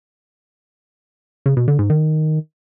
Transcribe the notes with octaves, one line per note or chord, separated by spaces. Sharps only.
C#3
B2
D3
G#2
D#3